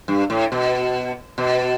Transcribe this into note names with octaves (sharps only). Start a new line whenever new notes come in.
G2
A2
B2
B2